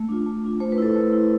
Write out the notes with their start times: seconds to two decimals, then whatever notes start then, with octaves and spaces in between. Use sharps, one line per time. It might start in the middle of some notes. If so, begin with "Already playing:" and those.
Already playing: A3
0.09 D4 F4
0.26 A3
0.44 D4 F4
0.60 A3 C5
0.72 B4
0.78 E4 A4 C5
0.96 A3
1.13 E4